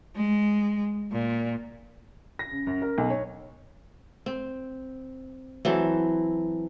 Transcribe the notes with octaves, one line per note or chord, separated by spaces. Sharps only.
G#3
A#2
A#6
C#3
F#2
A#4
B1
C#5
C4
E3 F#3 C4 A4